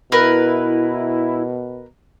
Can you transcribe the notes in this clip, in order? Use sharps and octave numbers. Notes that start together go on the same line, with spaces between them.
B2 E4 A#4 B4